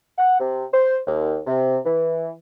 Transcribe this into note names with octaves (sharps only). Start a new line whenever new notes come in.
F#5
C3
C5
D#2
C3
E3